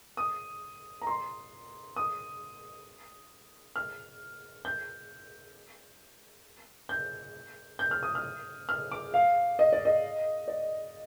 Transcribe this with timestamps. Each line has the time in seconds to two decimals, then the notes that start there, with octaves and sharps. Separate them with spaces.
0.17 D#6
1.02 A#5
1.07 C6
1.96 D#6
3.76 F6
4.65 G6
6.89 G6
7.79 G6
7.91 F6
8.03 D#6
8.15 F6
8.69 F6
8.92 D6
9.14 F5
9.59 D#5
9.72 D5
9.85 D#5
10.48 D5